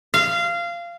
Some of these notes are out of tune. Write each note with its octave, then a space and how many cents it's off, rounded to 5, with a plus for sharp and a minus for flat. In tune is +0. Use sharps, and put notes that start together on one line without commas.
F5 -20